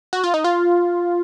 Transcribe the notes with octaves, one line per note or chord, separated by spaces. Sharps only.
F#4
F4
D#4
F4